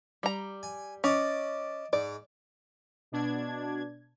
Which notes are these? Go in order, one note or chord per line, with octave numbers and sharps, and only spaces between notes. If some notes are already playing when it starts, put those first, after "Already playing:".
G3 A#5
G#5
C#4 D5 D#5 A5
G#2 D5
B2 D4 G#6